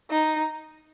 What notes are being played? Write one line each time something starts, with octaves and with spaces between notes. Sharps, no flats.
D#4